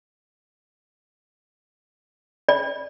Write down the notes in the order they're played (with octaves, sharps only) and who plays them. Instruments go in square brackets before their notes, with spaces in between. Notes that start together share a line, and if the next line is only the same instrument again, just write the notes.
[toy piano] D5